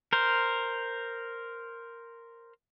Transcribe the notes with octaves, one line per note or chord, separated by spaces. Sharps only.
A#4 C5